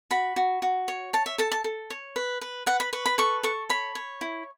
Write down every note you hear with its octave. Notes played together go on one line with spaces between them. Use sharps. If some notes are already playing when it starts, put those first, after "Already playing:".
F#4 B5
F#4
F#4
C#5
C#5 A5
E5
A4 A5
A5
A4
C#5
B4
B4
B4 F#5
B5
B4 C#6
B5
A4 C#6
A4 C#6
C#5 B5
C#5
E4